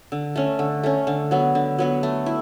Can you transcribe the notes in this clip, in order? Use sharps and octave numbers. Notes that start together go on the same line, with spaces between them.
D3
A3 C#4
D3
A3 C#4
D3
F#3 B3 F#4
D3
F#3 B3 F#4
A3
E4